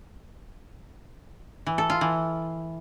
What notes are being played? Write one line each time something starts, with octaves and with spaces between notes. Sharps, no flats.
E3
A4
F4
E3